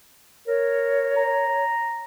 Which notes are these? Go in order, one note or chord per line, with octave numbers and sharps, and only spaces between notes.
A#4 C#5
A#5